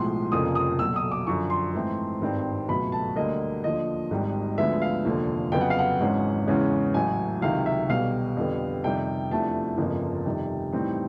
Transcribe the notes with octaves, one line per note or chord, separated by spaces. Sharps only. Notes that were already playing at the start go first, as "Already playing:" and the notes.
Already playing: B1 A2 F3 G#3 C6
F1 F2 C#3 F3 A#3 D#6
D#6
B1 A#2 F#3 E6
D#6
D6
F#2 D3 F3 C#6
C6
G#2 E3 A3 C4
G#1 G2 D#3 G3 C4
C#2 B2 F#3 A3 B5
A5
D2 D3 G3 A#3 D#5
D#2 D3 F3 D#5
G#1 G#2 D#3 G3
D2 D3 F3 G#3 B3 E5
F5
F1 D#2 D3 F3
F2 C#3 F#3 B3 G5
F#5
F5
F#5
G#1 G#2 E3 G#3 C#4
E2 C#3 E3 G#3 C#4
A1 A2 F#3 A3 G#5
C#2 C3 D#3 F#3 F5
E5
B1 B2 G3 F5
F2 D3 G3 B3
F2 C3 D#3 G3 G5
E2 C3 F3 A3 D4 A5
G1 F2 C#3 F3 A#3
F2 C3 D#3 G3
A2 E3 G3 C4 D#4